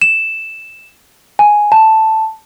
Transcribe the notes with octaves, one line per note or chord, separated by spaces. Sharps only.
E7
G#5
A5